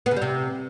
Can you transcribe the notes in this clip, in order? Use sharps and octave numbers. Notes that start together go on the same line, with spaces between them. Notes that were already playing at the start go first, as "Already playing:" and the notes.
B3
C#3
G3
C3